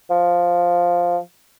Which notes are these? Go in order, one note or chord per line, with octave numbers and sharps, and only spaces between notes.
F3